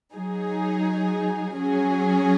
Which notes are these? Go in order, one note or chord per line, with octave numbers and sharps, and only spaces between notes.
F#3 D#4 G#4
F#3 C#4 G#4